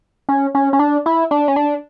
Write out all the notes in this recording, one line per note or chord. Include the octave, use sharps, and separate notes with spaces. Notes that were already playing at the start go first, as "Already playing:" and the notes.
C#4
C#4
C#4
D4
E4
D4
C#4
D4